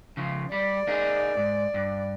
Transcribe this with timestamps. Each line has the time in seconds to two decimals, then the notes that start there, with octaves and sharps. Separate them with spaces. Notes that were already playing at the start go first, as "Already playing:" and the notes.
0.17 C#3 F3
0.52 G3 D5
0.87 A#3 D#4 G#4
1.37 G#2
1.74 G2